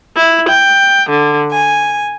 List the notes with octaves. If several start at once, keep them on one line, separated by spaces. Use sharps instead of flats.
E4
G5
D3
G#5